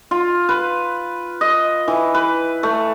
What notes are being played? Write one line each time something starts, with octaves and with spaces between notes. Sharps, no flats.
F4
B4
D#5
E3
B4
A3